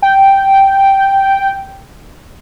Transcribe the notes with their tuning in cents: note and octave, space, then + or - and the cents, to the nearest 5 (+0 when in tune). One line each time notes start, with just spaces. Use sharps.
G5 -5